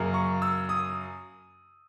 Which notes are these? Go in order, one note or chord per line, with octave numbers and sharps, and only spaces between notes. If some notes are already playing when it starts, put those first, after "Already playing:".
Already playing: F#2 C#3 F#3 A#3
C#6
E6
D#6